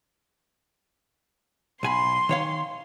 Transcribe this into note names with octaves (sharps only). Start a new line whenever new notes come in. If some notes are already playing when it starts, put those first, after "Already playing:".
B1 G#5 B5 C6
D#3 C#5 F5